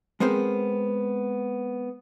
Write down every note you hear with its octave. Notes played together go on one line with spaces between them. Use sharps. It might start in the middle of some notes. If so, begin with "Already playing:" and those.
G#3 B3 C4 A#4 C5